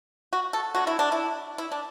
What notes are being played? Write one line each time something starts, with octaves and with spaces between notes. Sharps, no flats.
F#4
A4
D3 F#3 A3 F#4
E4
D4
E4
E4
D4